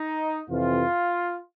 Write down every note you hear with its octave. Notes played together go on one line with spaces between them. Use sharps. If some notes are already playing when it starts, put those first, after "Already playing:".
Already playing: D#4
F2 C3 E3 F4